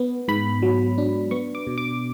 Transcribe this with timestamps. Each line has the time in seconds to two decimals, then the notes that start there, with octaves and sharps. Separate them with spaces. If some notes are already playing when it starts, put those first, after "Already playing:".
Already playing: B3
0.28 G#2 B5
0.62 F#3
0.98 D4
1.31 B3 C#6
1.55 D6
1.67 B2
1.78 D6